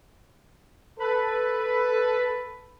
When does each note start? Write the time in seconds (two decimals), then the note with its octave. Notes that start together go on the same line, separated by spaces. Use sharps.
0.99 A4 B4